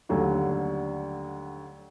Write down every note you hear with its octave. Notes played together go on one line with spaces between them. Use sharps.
D#2 D3 F#3 G3 A3